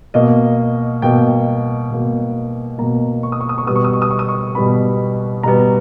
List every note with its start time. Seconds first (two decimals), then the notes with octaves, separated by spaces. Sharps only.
0.14 B2 A#3 D#5
1.02 B2 A#3 G5
1.91 B2 A#3
2.78 B2 A#3 A#5
3.23 C#6
3.32 D#6
3.40 C#6
3.49 D#6
3.58 C#6
3.67 B2 G3 B3 D#6
3.76 C#6
3.84 D#6
3.93 C#6
4.02 D#6
4.11 C#6
4.19 D#6
4.29 C#6
4.55 B2 G3 B3 B5
5.43 B2 G3 B3 A#5